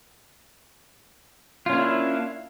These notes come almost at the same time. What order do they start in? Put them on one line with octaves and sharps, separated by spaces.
F4 C#4 A#3 D4 E4